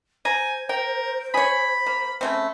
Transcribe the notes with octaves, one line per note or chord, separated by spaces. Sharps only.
C5 G#5 A#5
A#4 G5
G#4 C#5 B5
A#3
C#3 A3 C4 B5